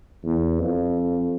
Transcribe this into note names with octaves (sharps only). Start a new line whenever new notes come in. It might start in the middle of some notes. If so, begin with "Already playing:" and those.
E2
F2